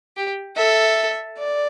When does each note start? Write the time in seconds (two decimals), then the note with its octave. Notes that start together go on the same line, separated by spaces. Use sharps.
0.17 G4
0.57 A4 E5
1.38 D5